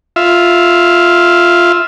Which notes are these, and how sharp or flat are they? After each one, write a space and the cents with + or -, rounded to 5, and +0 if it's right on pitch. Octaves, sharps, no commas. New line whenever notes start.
F4 +0 E5 +0